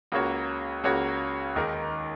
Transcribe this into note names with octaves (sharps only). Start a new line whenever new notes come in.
C#2 C#3 A#3 F#4 C#5
C#2 C#3 A#3 F#4 C#5
D#2 D#3 G#3 D#4 A#4